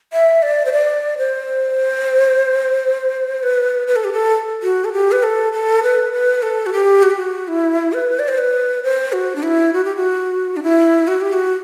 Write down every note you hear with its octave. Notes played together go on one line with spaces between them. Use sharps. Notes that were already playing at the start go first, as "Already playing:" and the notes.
E5
D5
C5
D5
C5
B4
B4
A4
G4
A4
F#4
A4
G4
B4
A4
A4
B4
B4
A4
F#4
G4
F#4
G4
F#4
E4
B4
D5
C5
B4
C5
F#4
D4
E4
F#4
G4
F#4
D4
E4
F#4
G4
F#4